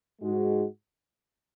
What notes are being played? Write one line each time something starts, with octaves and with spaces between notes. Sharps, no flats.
G#2 G#3 F#4